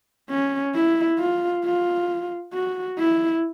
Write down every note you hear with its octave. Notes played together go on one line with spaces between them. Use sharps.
C#4
E4
F4
F4
F#4
E4